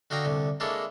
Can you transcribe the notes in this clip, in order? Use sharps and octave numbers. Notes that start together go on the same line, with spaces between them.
D3 F#4 D#5 F5 G5 A#5
C2 D3
G#3 A#3 D4 E4 A4 C#5